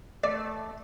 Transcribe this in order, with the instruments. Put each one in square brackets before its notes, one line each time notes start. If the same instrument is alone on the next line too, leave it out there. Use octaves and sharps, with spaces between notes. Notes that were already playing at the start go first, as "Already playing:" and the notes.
[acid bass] A3 [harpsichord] D5